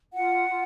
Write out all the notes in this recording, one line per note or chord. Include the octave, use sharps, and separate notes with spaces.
F4 F#5
F4